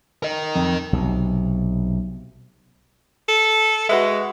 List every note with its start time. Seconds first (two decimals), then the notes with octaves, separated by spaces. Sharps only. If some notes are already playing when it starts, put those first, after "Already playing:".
0.23 A#4 D#5
0.55 F2
0.93 B1 C3
3.29 A4
3.89 G#3 F#4 B4 E5